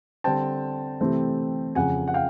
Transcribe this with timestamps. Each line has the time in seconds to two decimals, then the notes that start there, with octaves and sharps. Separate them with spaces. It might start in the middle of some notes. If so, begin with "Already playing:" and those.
0.24 D3 G3 C4 G5 A5
1.01 C3 E3 A3 C4
1.75 F2 C#3 F3 F#5 G#5
2.08 F#5
2.14 F5 G5